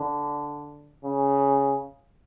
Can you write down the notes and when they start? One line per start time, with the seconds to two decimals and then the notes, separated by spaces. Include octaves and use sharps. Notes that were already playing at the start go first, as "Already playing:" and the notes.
Already playing: D3
1.05 C#3